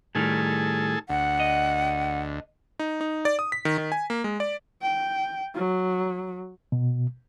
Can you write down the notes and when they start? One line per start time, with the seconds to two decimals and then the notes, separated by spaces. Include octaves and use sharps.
0.15 A2 D#3 G3 G#4 A4
1.09 D2 F#5
1.40 D#5
2.79 D#4
3.01 D#4
3.25 D5
3.39 D#6
3.52 B6
3.65 D#3
3.78 D#3
3.92 G#5
4.10 A#3
4.24 G#3
4.40 D5
4.82 G5
5.55 F#3
6.72 B2